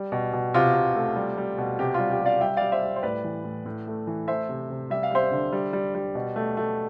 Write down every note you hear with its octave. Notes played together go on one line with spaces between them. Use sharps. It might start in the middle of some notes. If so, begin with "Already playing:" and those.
Already playing: G3
B2
B2
C3 F4
C3
A3
G3
G3
B2
C3 G4
G3 F4
G4
G3
D5 F5
G3 E5 G5
G3 D5 F5
C5 E5
G3
C5
A2 B4 D5
E3
A2
A2
A3
E3
A3 C5 E5
C3
C3
G3 E5
F5
G3 C5 E5
D3
G3
G3
G3
B2
A3
A3